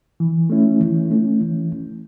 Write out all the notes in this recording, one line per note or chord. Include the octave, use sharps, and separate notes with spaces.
E3
A3 C#4 E4
E3
A3 C#4 E4
E3